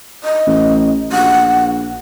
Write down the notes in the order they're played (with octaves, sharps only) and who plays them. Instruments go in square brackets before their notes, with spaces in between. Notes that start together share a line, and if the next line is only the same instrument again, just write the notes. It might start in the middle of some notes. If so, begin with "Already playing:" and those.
[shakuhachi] D#5
[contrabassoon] A1
[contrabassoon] A#1 [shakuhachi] F#5